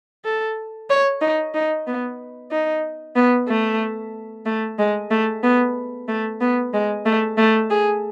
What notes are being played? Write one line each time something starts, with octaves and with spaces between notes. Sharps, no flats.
A4
C#5
D#4
D#4
B3
D#4
B3
A3
A3
G#3
A3
B3
A3
B3
G#3
A3
A3
G#4